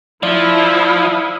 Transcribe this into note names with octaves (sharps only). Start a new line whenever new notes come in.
F3 E4 D5